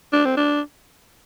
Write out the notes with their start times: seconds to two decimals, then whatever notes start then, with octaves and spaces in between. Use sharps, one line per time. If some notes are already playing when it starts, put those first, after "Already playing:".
0.13 D4
0.25 C4
0.37 D4